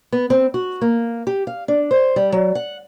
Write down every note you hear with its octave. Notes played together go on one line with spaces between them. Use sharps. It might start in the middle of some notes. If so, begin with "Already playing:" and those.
B3
C4
F#4
A#3
G4
F5
D4
C5
G3
F#3
F#5